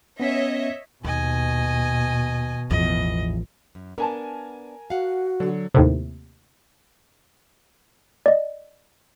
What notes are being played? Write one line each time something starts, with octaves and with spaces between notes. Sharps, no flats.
B3 C#4 C#5 D#5 E5 B6
D#2 B2 D#5 G#5
A1 E2 F3 D#5
F#2
B3 D4 A#4 G#5 A5
F#4 F5 F#5
D3 F#3
D#2 A2 C3
D5 D#5